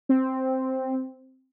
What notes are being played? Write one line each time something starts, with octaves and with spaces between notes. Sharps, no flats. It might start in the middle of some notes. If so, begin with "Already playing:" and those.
C4